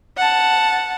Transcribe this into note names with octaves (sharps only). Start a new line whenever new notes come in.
F#5 A5